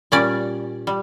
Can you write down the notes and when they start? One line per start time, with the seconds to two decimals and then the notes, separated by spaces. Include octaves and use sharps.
0.12 A#2 G3 C#4 D5
0.87 G3